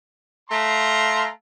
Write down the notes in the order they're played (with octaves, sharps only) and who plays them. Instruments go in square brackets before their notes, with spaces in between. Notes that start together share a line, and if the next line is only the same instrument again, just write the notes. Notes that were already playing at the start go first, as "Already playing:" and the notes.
[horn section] A3 F5 A#5 C6